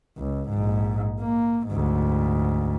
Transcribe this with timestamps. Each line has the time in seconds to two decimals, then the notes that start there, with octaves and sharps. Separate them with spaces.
0.18 C#2
0.49 A#1 G#2
1.21 A#3
1.68 D2 G#2